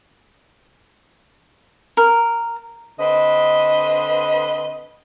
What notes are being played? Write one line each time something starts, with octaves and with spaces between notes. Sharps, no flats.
A#4
D3 C4 B4 D#5